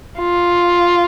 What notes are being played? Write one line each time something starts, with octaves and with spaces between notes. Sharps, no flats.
F4